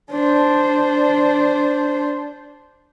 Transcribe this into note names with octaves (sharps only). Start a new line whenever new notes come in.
D4 C5